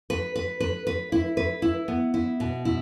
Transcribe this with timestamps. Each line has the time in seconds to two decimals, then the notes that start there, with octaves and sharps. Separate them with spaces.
0.10 B4
0.35 B4
0.60 B4
0.87 B4
1.12 E4
1.37 B4
1.62 E4
1.88 B3
2.14 E4
2.40 B2
2.65 E4